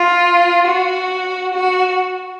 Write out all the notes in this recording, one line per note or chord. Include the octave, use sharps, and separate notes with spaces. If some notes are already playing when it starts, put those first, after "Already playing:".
Already playing: F4
F#4
F#4